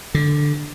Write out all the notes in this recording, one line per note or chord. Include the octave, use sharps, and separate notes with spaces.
D3